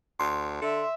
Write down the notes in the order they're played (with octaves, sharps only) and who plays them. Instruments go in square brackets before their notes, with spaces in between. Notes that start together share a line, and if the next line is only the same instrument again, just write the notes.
[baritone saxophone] D2 [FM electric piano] C6
[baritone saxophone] D3 [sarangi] E5